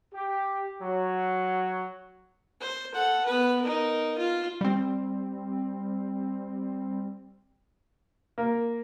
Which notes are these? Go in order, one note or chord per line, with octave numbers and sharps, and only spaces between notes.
G4
F#3
C5
A4 F#5
B3 B4
D#4 A#4
F4
G3 C4
A#3